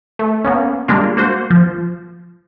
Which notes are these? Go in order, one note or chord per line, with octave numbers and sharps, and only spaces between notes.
A3
A#3 B3 C#4
G3 G#3 A#3 D4 F4
A#3 F#4 C5
F3